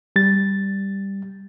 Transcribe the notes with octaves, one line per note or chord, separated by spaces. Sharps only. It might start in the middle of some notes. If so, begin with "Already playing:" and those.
G3 A6